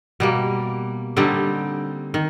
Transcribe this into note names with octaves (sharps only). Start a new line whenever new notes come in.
B2 G3 A#3
D3 G3 C4 D#4
D#3